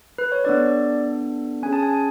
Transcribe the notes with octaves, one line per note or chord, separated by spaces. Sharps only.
B4
C#5
B3 D4 A4 D5
C#4 G#4 G#5
A5
G#5